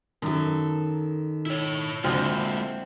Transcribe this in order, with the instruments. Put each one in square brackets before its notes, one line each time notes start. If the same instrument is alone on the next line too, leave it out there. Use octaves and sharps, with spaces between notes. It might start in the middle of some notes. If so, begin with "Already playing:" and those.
[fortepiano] F#2 [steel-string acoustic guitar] D#3 A4
[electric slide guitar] E4 C#5
[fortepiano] D2 [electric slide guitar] G#3 A#3 F4 [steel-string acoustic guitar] C4 E4